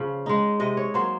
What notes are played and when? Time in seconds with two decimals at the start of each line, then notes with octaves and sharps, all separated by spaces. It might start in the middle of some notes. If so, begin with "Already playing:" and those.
Already playing: C#3 F3
0.26 G#3 D#4
0.60 C3 D#5
0.77 C#5
0.94 F#3 A#3 C5